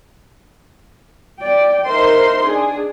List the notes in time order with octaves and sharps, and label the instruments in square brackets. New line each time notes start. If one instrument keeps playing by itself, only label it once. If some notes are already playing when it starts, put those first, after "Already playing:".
[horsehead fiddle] D5 G5
[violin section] D#4 A#4 C6 [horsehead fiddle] C5 E5
[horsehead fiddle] D4 [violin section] G#4